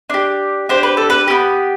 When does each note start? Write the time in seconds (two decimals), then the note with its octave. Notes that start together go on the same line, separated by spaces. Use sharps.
0.10 D4 G4
0.69 D4 G4 C5
0.83 B4
0.97 A4
1.10 B4
1.28 B3 E4 G4